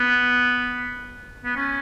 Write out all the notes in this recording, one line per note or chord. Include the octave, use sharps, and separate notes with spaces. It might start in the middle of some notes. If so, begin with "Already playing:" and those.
Already playing: B3
B3
C#4